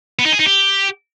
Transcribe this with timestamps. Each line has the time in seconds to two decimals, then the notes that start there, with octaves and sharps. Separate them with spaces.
0.19 B3
0.26 D#4
0.32 G#4
0.39 D#4
0.46 G4